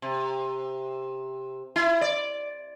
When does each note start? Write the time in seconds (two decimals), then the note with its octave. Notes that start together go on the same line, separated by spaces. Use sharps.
0.02 C3
1.76 E4
2.01 D5